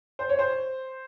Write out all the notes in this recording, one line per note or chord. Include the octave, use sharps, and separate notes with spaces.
C5
C#5
C5